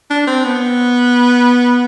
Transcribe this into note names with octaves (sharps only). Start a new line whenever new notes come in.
D4
C4
B3